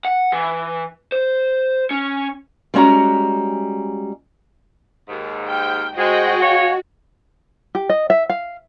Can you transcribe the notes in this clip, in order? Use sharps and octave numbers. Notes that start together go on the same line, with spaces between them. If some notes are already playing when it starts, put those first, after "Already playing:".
F#5
E3
C5
C#4
G3 G#3 C#4 F#4 A#5
D#2 G#2
G5 F6
G#3 F#4 C5 D#5 G5
G#4 C#5 F5
G4
D#5
E5
F5